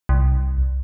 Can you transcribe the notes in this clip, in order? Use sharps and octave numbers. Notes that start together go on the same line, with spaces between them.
C2